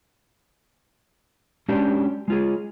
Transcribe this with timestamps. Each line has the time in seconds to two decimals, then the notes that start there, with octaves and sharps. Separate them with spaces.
1.69 G#3 C#4 D4 F#4 G4
2.28 G#3 F4 G#4